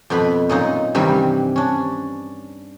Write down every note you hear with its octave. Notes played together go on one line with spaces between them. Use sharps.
F2 B2 B4 B5
F#2 A#2 D#4
G2 C3 D#3 E3 G3
C#4 D4